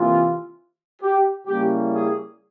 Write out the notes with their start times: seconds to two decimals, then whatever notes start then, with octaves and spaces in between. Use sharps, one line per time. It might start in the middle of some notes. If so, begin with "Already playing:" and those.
Already playing: C3 E3 A#3 F4
1.02 G4
1.47 C#3 G3 A#3 C#4 E4 G4
1.92 G#4